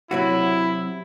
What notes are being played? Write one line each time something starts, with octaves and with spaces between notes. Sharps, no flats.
C3 F#3 E4 F#4